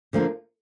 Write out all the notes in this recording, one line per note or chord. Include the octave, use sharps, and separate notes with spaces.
D3 F3 A#3 D4